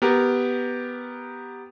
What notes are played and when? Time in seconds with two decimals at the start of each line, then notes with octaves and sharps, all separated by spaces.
0.02 B3 G4 A#4